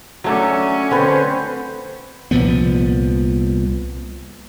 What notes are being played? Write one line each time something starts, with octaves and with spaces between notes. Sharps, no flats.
F#3 A3 C#4 D4
D3 C4 B4 C5
C2 A#2 F3 B3